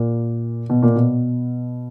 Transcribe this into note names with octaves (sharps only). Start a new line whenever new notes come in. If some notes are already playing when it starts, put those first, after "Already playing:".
Already playing: A#2
B2
A#2
B2